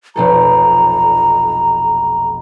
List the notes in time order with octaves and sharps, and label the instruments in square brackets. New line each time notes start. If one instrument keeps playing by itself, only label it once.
[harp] F1 B1 A4 [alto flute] A#5